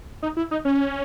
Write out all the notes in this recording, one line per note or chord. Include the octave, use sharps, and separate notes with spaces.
D#4
E4
D#4
C#4